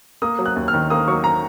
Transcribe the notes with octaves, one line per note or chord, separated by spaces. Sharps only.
A#3 D#6
F#3
F#6
D#2
F6
D#3
A#3 D#6
F#3 C#6
A#5